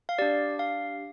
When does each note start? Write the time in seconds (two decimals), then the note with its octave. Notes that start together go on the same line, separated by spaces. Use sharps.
0.09 F5
0.19 D4 G4 D5
0.59 F5